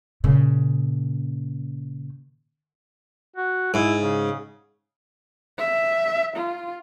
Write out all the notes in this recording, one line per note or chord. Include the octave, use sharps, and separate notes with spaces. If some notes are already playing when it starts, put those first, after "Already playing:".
A#2 C#3
F#4
G#2 E4
C#3
E5
F4